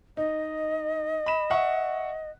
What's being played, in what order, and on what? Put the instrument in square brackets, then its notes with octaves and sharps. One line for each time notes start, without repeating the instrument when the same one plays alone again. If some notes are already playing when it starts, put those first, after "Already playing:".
[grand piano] D#4 [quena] D#5
[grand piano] B5 E7
E5 F#5 C#6